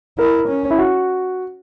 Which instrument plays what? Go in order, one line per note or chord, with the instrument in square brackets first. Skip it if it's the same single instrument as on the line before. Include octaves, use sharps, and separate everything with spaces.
[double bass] E4 [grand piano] A#4
[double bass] C#4
[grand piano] E4
F#4